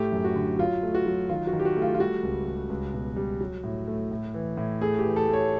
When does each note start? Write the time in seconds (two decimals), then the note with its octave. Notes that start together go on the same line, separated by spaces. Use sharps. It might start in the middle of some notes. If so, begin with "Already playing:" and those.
Already playing: A2 A3 G4
0.12 F#2
0.24 F#4
0.35 D3
0.59 F#3 F4
0.83 A3
0.95 F#4
1.06 F#3
1.29 D#3 F4
1.47 F#4
1.53 D#3
1.59 G4
1.65 F#4
1.77 A3
1.82 F4
1.94 F4
2.00 G3 F#4
2.23 C#2
2.47 G3
2.70 C#2
2.94 B2
3.16 G3
3.41 F#3
3.63 A2
3.88 A3
4.11 A2
4.34 E3
4.57 A2
4.81 A3 G#4
4.99 G4
5.04 E3
5.16 A4
5.28 A3
5.33 C#5